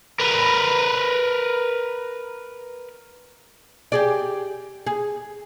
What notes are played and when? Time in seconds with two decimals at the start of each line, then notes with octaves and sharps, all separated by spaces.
0.20 A#4 B4
3.92 G4 G#4 D5
4.87 G#4